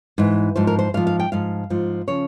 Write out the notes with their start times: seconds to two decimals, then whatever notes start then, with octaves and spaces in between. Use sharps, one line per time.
0.18 G#2 E3
0.56 G#2 F3 C5
0.67 A#4
0.79 C5
0.94 G#2 F3 F5
1.07 F5
1.19 G5
1.32 G#2 F3 F5
1.70 G#2 F3
2.08 C#3 F3 C#5